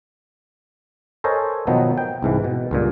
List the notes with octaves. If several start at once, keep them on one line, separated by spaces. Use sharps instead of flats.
A4 A#4 C5 C#5 D#5 G#5
B2 D#3 F3 F#3 B3 D#4
G5
C2 G#2 E3
B2
C#2 G2 A#2